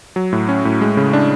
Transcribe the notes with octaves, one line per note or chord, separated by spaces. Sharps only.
F#3
A2
C#4
A2
G#3
C#3
D4